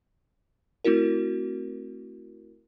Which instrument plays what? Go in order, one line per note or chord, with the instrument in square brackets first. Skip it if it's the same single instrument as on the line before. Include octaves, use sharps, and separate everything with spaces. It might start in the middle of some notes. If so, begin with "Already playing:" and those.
[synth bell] A3 C4 E4 F#4 A#4